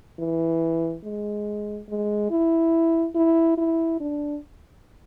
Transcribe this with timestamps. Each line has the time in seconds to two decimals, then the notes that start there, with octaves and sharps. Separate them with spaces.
0.19 E3
1.04 G#3
1.88 G#3
2.30 E4
3.15 E4
3.58 E4
4.00 D4